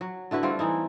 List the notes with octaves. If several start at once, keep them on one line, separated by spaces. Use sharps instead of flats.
F#3
D3 E4 F#4 B4
G3 A3 C4 F4
E3 D#4 E4